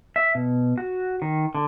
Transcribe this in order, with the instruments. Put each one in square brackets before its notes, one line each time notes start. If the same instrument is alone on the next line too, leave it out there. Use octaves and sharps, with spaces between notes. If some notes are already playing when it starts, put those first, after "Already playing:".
[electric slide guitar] E5
B2
F#4
D#3
D3